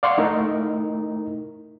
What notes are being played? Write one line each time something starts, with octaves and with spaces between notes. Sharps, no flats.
D5 F5 F#5 C6 C#6
A3 D#4 E4 A#4